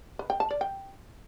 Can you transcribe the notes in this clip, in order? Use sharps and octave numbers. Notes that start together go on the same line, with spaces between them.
B4
G5
A5
D5
G5